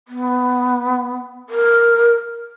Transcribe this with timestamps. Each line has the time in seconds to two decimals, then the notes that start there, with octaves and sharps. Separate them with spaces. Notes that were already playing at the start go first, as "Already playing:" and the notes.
0.08 B3
1.49 A#4